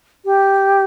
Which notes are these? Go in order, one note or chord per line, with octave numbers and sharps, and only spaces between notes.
G4